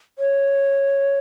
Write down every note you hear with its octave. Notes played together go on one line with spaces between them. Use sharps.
C#5